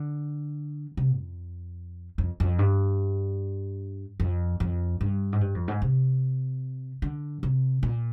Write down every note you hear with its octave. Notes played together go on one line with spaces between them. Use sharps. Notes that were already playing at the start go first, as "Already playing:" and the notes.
Already playing: D3
C3
F2
F2
F2
G2
F2
F2
G2
G#2
G2
F2
G#2
C3
D3
C3
A#2